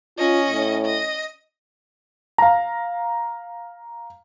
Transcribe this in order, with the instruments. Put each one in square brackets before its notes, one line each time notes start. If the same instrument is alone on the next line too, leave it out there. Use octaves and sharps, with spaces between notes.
[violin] C#4 D#5 [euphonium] F4
[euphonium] A2
[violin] D#5
[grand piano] F5 A#5